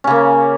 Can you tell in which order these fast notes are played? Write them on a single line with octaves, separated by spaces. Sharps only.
C#4 C#3 A#3